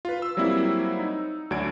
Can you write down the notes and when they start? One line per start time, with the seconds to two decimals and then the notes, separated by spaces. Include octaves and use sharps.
0.05 F4 B4
0.22 E6
0.37 F#3 G3 A#3 C4 E4
0.99 D#4
1.51 D2 F#3 D4 G#6 D7